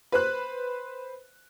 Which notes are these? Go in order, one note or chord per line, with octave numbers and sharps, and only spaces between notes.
B4 C5 F#6